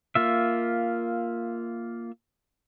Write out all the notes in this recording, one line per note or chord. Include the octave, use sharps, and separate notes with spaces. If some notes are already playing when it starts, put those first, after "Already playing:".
A#3 F4 E5